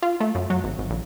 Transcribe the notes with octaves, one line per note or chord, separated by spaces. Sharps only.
F4
A3
F#2
F#3
G#1
G#1
A#1